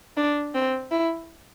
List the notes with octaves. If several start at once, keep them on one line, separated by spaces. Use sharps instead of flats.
D4
C4
E4